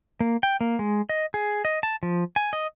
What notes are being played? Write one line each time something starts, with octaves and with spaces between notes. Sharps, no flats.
A#3
G5
A#3
G#3
D#5
G#4
D#5
A5
F3
G#5
D#5